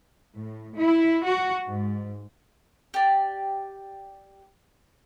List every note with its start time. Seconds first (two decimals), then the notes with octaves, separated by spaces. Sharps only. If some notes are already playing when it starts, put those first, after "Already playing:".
0.34 A2
0.76 E4
1.24 F#4
1.66 G#2
2.94 G4 D5